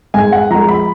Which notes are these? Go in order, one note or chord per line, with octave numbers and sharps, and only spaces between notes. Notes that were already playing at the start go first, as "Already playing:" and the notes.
G#2 G#5
F#5
F3 G#3 A#5
B5